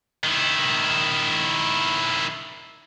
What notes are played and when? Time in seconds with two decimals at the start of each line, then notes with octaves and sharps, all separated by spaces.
0.24 D#3 E4